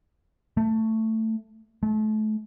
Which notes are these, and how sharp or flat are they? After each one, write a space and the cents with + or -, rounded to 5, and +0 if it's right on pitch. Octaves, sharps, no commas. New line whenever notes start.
A3 +15
A3 -35